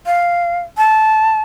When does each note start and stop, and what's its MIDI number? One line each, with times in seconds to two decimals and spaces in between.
0.06 0.59 77
0.77 1.41 81